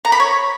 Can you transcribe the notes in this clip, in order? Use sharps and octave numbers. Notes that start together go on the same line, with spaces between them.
A#5
B5
C#5